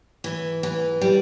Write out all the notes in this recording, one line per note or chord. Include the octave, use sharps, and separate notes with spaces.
E3
E3
G3